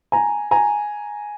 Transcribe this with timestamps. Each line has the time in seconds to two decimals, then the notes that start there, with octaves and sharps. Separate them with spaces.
0.12 G#5 A#5
0.51 G#5 A#5